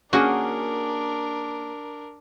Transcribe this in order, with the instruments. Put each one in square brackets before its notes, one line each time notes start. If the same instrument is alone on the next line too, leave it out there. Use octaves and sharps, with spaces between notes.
[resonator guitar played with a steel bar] A#3 C#4 G#4 [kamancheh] D4 A#4 [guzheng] F#4